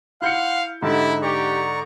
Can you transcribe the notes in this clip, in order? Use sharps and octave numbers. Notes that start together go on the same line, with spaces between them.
E4 F5 F#5 C6 F#6 G6 C#7
G#2 D3 D#4 E4 G4 A5
G4 D5 A#5 C#6